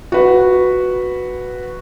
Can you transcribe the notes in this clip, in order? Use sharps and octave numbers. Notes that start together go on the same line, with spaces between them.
F#4 B4